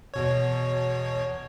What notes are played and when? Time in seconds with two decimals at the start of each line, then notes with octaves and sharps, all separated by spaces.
0.14 E2 B2 C#5